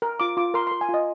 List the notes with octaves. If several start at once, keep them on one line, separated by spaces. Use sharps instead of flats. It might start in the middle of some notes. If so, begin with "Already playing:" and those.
A#4
F4 D6
F4 D6
A#4 C6
A#4 C6
G#5
F4
D#5